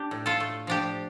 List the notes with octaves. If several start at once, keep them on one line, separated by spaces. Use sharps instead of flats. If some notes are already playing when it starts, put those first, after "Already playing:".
Already playing: D4 G4
A2
F4 A4
A3
F3 D4 G4